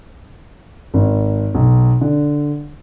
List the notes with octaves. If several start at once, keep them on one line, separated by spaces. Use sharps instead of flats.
G#1
B1
D3